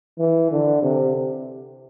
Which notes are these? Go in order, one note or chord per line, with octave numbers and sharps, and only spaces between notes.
E3
D3
C3